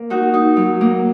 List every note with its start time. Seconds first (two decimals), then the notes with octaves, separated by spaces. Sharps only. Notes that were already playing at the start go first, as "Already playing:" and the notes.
Already playing: A#3
0.10 D#4 F#4
0.34 D#4
0.57 F#3
0.81 A#3